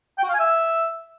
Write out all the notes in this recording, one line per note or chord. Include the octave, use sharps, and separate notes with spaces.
G5
F#4
F5
G#5
E5